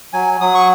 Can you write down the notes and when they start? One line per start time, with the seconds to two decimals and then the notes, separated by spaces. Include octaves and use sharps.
0.13 F#3 G#5
0.41 F#3 D#6
0.55 C#6